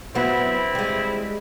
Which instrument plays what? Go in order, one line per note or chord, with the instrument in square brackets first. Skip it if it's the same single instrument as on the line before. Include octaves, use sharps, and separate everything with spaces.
[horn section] G2 C4 E4 [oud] F#3 B3
[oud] G3 G#3